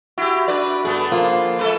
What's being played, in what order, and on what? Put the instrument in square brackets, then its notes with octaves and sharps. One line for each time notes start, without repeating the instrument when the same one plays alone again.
[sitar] E4 G4 [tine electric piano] F#4
[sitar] D4 B4 D5
[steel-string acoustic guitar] G2 [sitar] D3 B3 G#4
[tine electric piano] F3 A#3 [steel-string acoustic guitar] F4
[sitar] G#3 A4 B4